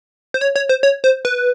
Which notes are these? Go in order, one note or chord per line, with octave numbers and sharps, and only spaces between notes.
C5
C#5
C#5
C5
C#5
C5
B4